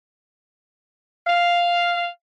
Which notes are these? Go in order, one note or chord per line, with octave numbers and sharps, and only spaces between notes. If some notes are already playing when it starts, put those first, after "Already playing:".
F5